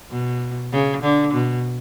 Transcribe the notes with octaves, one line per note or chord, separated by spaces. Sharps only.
B2
C#3
D3
B2